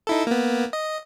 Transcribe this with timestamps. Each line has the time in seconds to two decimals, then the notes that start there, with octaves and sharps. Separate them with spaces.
0.07 D#4 E4 A4
0.27 A#3 B3
0.73 D#5